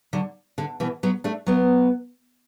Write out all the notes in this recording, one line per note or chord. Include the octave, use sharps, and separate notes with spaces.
D3 F#3
D3
B2 E3
F#3 B3
A3 D4
F#3 B3